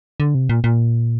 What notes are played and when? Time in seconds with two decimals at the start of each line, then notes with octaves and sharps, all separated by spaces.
0.20 D3
0.35 C3
0.49 A#2
0.64 A#2